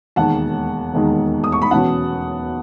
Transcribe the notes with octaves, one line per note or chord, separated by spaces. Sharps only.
E1 D#2 D#3 G#3 F#5 A5
E1 D#2 D#3 G#3
D#6
C#6
B5
E1 E2 B2 F#3 C#4 F#5 A5